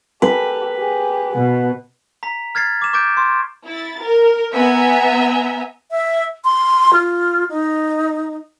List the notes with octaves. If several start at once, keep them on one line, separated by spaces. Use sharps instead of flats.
G4 A4 B4
G4 G#4
B2 B3
A#5 B6
F6 G#6 A6 C7
D6 E7
C#6 D6 G6 A6 D7
C6
E4 A6
A#4
B3 E5 G#5 A#5
E5
C6
F4
D#4